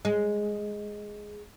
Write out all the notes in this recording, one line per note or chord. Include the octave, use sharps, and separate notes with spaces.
G#3